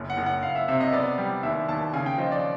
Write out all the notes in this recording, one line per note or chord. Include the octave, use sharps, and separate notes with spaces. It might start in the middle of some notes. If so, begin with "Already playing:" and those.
Already playing: F#1
F#5
F#1
F#5
F#1 F5
E5
C3 E5
D#5
B3 D5
G3
D#2 E5
D#2 A5
C#3 G#5
G5
F3 D#5
D5